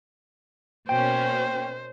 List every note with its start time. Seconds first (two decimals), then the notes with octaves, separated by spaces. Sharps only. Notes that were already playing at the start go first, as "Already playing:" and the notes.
0.89 B2 A#3 C#4 C5 G5